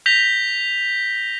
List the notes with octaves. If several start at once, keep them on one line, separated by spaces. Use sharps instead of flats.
G6 A#6 B6 F7 G7